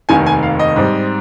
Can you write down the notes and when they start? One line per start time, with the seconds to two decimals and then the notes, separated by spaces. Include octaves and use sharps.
0.09 F1 D#2 D#3 G#5
0.26 G#5
0.43 F5
0.59 D#5
0.76 G#2 G3 C4